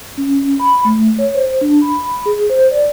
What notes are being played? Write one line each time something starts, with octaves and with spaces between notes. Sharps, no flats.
C#4
B5
A3
C#5
C5
D4
B5
G#4
C5
D5